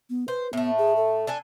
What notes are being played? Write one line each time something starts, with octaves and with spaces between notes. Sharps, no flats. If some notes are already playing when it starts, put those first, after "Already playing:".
B3
B4 C5
A2 A3 B3
G#4
A4
D4 A4 G#5